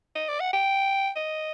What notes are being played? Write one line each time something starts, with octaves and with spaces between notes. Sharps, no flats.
D#5
D5
F#5
G5
D#5